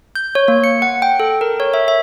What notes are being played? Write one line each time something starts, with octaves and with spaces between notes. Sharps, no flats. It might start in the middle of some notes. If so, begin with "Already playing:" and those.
G6
C#5
A#3
C#7
F#5
G5
A4
A#4
C#5
E5
E5